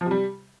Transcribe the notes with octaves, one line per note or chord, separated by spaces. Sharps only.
F3
C3
G3